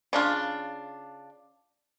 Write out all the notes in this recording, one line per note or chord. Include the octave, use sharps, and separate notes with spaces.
C#3 D4 F4